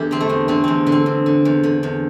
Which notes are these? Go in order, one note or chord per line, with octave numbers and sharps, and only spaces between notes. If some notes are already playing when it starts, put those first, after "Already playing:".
Already playing: E2 D4 E4 G4 A4
D3 C4
A3
E2
D3 C4
E2 C4
D3
C4
E2
D3
E2
D3
E2